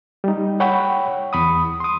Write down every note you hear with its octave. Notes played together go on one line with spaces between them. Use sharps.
G3 D#4
C#5 F#5 G5 B5 C#6
E2 B5 D#6
C6 D#6